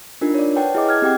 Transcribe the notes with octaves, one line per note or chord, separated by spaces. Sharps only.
D4 D#4 F4 A#4
C#5 D5
B4 C#5 F#5 G5 A5
E4 G#4 D#5 D6
F6 G#6
C4 G4 F#5 G5